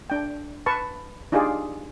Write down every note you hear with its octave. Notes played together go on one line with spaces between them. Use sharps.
D4 G5
B4 A5 C#6
D4 D#4 F4 G4 G#4 D5